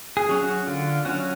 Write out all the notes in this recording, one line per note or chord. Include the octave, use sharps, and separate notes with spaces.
G#4
F#3 C#4
F#4
D3 F4
F#3 C#4 F#4